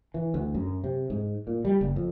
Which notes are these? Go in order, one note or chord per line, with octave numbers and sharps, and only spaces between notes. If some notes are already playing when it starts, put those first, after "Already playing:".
E3
D2
F#2
C3
G#2
A#2
G3
F#1
F2